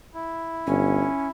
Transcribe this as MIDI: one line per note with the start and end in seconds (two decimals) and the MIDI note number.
0.14 1.30 64
0.66 1.07 31
0.66 1.28 61